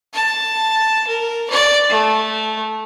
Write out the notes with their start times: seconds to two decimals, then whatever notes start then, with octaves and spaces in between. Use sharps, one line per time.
0.13 A5
1.07 A#4
1.50 D5
1.89 A3